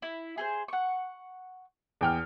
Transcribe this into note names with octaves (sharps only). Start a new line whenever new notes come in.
E4
G#4 A4 C5
F#5 C#6
E2 G5 F6